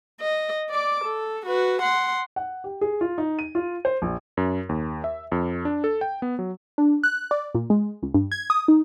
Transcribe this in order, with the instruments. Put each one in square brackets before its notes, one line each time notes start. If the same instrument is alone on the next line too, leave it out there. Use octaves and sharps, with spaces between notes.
[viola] D#5
D5 D6
A4
F#4 B4
F#5 C6
[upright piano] F#5
G4
G#4
F4
D#4
D#7
F4
C5
A#1
[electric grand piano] F#2
D#2
E5
F2
D4
A4
G5
B3
F#3
[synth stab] D4
F#6
D5
A#2
G#3
C#2
G2
G#6
D#6
D#4